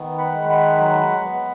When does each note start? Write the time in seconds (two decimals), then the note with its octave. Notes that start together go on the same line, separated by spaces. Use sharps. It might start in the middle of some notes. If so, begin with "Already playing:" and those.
Already playing: D#3 B3
0.18 F#5 B5
0.34 G#3
0.49 F#5 B5
0.78 F#3 F#5 B5
1.24 B3